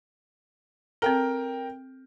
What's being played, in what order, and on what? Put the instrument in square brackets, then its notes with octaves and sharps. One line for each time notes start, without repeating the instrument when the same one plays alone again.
[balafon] C4 A4 [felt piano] A#4 G5